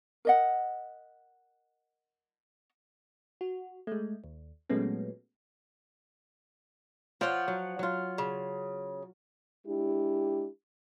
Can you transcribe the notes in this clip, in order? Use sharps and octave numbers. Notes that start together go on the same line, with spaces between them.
A#4 D#5 F#5
F#4
G#3 A3
D#2
A#2 F#3 G#3 A3 B3 C#4
F3 F4 C#5 F#5 G5
F#3
F#3 F4
C#3
G#3 D4 E4 G4